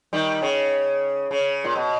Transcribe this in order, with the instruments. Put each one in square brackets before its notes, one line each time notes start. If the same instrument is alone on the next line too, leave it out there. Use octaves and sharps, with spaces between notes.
[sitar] D#3 G3
C#3
C#3
A#2
B2